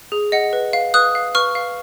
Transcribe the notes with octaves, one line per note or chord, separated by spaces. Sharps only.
G#4
D#5 F#5
B4
F5
B4 D#6 F#6
F5
B4 C#6 F6
F5